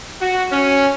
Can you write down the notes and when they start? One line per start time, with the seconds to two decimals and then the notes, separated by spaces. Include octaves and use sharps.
0.21 F#4
0.51 C#4